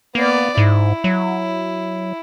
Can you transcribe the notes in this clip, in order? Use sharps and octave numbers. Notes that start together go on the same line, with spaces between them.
A#3 B3 D5
G#2 E4
F#3